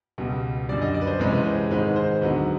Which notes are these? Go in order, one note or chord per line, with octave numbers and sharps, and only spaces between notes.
C#2 B2 G3
F#2 D3 G3 D5
D#5
D5
B4
C5
C2 C3 E3 G#3 C#4 B4
B4
C5
B4
G#2 D#3 G#3 C4 B4
C5
D2 D3 F#3 B3 D#4 B4